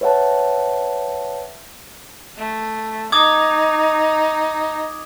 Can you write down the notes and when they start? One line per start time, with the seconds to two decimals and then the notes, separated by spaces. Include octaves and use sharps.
0.01 B4 C#5 E5 F#5 A5
2.37 A3
3.12 D#4 D6 D#6 G#6